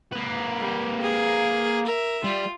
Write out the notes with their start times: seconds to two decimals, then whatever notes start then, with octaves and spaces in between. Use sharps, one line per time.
0.12 A#3 B4
0.59 G3
1.02 G#4
1.86 A#4 E5
2.24 G3 F4